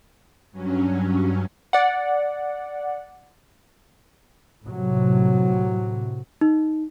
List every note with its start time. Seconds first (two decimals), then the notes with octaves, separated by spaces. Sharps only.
0.51 G2 F#3 C#4
1.73 D5 F#5
4.65 A2 C3 F#3
6.41 D#4